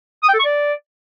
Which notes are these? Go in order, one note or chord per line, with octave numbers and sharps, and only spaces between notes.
D#6
G5
A4
C#6
D5